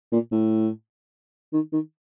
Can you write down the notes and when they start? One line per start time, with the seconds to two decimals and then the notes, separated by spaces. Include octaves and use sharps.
0.12 A#2
0.32 A2
1.53 D#3
1.73 D#3